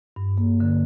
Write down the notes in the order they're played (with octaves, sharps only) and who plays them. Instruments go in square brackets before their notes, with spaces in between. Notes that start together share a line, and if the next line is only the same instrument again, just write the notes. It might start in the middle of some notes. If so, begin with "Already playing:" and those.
[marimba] G2
A#3
D3